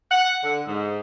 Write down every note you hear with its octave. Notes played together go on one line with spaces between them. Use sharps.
F#5
D3
G#2